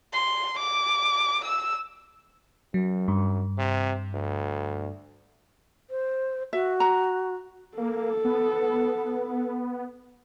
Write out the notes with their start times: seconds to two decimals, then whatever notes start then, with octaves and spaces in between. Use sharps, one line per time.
0.13 C6
0.59 D6
1.45 E6
2.74 F#2 F#3
3.08 G2
3.58 C3
4.14 D2
5.90 C5
6.53 F#4 E5
6.80 A#5
7.78 A#3 A4
8.25 B3